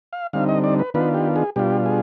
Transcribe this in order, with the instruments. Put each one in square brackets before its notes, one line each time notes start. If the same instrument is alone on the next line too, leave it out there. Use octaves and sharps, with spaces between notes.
[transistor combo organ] F5
D3 G3 C4 D#4 F5
D#5
D5
B4
D#3 B3 D4 F4 B4
G4
G#4
B2 G3 D4 F4 G4
G#4